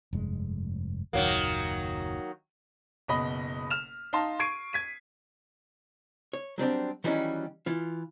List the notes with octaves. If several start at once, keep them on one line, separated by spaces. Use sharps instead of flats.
F1 G2 G#3
F#1 D#2 A#2 D#3 F#3 A#3
F#1 B2 D#5 B5
F6 E7 F7
D#4 F5 A5 C6
C#6 G#6 C7 D7 D#7
G#6 B6 D#7
C#5
F#3 G3 C4 D4
D#3 E3 F#3 G3 C4 C#4
E3 F4